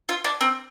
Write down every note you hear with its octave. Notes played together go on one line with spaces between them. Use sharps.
F4
D4
C4